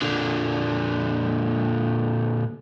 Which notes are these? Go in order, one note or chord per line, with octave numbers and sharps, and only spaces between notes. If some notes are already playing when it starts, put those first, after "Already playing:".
A#2 D3